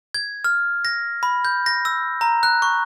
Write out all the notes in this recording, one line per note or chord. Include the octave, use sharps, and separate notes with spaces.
G#6
F6
A#6
B5
G6
A#6
E6
A#5
F#6
C#6